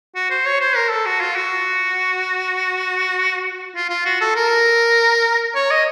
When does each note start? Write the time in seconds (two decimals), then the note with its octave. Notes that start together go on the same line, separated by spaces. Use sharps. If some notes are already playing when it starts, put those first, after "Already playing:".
0.15 F#4
0.30 C5
0.46 C#5
0.61 C5
0.76 A#4
0.90 A4
1.06 F#4
1.20 F4
1.36 F#4
3.76 F4
3.90 F4
4.05 F#4
4.21 A4
4.36 A#4
5.55 C#5
5.71 D#5